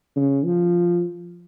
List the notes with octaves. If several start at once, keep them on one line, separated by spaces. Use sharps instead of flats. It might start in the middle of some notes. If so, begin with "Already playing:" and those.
C#3
F3